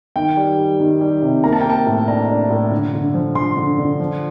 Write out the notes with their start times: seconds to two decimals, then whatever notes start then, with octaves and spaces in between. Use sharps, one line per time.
0.16 D#3 G5
0.37 G3
0.58 G3
0.80 D#3
1.01 G3
1.22 C3
1.44 A#3 A#5
1.53 A5
1.61 G5
1.65 A#3
1.70 A5
1.86 A2
2.07 D4 A#5
2.28 D4
2.50 A2
2.71 D3
2.93 D3
3.14 F3
3.35 D3 C6
3.57 D3
3.78 D3
4.00 F3